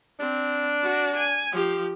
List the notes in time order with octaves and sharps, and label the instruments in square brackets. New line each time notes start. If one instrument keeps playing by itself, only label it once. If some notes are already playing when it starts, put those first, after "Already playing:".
[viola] C4 [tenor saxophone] D4
[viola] F#4
G#5
F3 G4